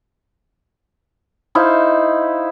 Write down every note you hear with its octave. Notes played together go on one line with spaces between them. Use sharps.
D#4 E4 C5 F5